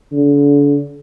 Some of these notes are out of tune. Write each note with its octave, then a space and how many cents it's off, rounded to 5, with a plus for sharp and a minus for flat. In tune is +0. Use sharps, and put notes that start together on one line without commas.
D3 -40